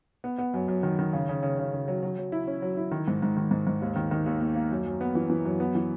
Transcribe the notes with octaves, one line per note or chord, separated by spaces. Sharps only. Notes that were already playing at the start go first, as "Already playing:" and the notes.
B3
B3
F#2
F#2
D#3
D#3
C#3
C#3
C#3
C#3
C#3
F#3
F#3
F#3
E4
C#4
F#3
E4
D#3
G#2
G#2
D#3
G#2
G#2
D#2
D#3
D#3
D#2
A#3
A#3
F#2
F#2
B3
E3
E3
F#2
B3
E3